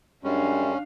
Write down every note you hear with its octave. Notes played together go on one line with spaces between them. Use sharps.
F#2 G3 G#3 C#4 D4 F5